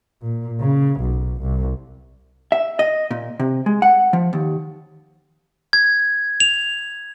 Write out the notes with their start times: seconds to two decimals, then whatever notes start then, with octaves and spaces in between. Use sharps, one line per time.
0.22 A#2
0.61 C#3
1.01 B1
1.41 C2
2.52 E5
2.79 D#5
3.11 A#2
3.40 C3
3.66 G#3
3.82 F#5
4.13 F3
4.33 D#2
5.73 G#6
6.40 F7